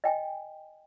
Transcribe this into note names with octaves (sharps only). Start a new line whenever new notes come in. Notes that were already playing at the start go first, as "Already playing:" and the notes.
D#5 G5 G#5